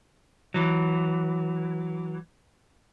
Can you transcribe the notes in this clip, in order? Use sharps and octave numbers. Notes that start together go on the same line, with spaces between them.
E3 F#3